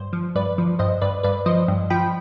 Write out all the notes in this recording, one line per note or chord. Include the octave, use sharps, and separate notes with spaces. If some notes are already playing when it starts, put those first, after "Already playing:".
Already playing: G2 C5
F3
G2 B4 D5
F3
G2 C5 D#5
G2 B4 D5
G2 B4 D5
F3 C5 D#5
G2
F3 G5 B5